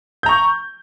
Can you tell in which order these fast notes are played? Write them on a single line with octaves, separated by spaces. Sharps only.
G6 A#5 C#6